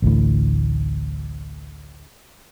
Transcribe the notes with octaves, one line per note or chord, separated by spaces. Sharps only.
A1 D2 A2